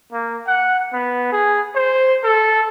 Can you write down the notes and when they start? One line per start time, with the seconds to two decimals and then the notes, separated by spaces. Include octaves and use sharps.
0.12 A#3
0.47 F#5
0.92 B3
1.32 G#4
1.75 C5
2.23 A4